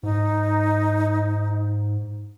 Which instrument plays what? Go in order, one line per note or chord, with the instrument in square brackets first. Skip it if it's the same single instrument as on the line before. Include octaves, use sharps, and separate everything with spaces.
[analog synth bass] G#2 [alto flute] D#4